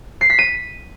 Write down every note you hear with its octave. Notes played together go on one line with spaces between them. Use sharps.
C7
B6
D#7